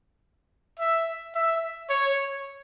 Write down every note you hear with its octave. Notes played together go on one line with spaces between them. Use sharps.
E5
E5
C#5